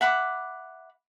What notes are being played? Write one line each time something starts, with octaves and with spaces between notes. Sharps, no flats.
E5 F#5 B5 D6